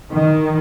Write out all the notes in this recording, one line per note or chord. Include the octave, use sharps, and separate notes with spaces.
D#3